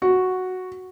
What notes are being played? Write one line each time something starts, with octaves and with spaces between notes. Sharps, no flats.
F#4